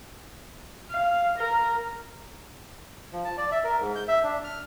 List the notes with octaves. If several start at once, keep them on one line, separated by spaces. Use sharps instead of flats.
F5
A#4
F3
A5
D5
E5
A#4
G#2
G6
E5
D4
F6